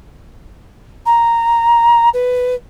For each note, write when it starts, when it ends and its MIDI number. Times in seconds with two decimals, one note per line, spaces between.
1.06 2.09 82
2.13 2.55 71